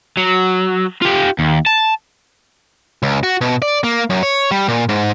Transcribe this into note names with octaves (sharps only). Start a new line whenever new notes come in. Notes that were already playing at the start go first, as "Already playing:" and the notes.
F#3
F4 G4
D#2
A5
C#2
F#4
B2
D5
A#3
F#2
C#5
G3
A#2
G#2